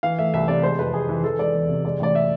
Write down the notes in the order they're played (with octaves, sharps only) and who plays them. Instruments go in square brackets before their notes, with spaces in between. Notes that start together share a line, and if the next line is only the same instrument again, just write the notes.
[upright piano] E3 F5
A3 E5
C2 E5
C3 D5
G#3 C5
F2 B4
F2 G#4
E3
E3 A4
G#3 D5
E2
C3
G#3 D5
A1 D5
E5